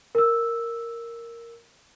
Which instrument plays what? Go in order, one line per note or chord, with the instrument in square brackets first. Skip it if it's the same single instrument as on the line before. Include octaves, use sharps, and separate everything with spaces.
[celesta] A#4 E6